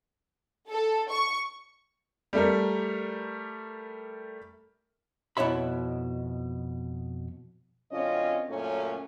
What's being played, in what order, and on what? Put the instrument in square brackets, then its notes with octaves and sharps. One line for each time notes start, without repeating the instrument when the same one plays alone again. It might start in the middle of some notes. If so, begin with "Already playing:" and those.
[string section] A4
C#6
[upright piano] G3 A3 A#4
[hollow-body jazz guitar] F2 B2 E4 C#5 E5 B5
[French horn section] F#2 D3 C4 C#4 F4 D#5
F#2 A#2 A3 C#4